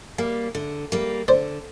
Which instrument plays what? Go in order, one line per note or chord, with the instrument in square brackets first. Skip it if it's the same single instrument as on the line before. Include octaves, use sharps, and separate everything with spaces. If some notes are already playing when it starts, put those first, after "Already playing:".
[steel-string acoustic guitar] G3 A#3
D3
G3 A#3
[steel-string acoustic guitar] D3 [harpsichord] C5 D5